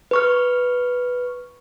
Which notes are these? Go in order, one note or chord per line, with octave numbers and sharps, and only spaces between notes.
B4 C#6 F6